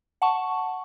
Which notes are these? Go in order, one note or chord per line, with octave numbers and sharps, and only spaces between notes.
F#5 A5 C#6